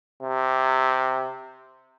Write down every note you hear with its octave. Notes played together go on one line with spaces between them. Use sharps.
C3